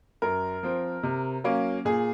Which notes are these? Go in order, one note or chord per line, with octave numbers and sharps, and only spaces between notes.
F#2 A#4
F3 C4
C3
F#3 A#3 C#4
A#2 G#4